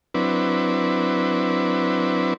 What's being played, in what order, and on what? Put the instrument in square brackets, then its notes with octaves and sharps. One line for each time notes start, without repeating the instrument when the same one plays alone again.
[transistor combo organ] F#3 C4 D4 E4 B4